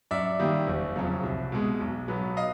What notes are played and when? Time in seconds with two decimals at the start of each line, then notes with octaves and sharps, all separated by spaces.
0.11 F#2 D5 E5
0.39 D#3 G3 A#3
0.67 F#1
0.96 F2 C#3 F#3
1.23 C2
1.52 B2 G#3
1.80 B1
2.08 B2 F#3 B3
2.37 D#5 F5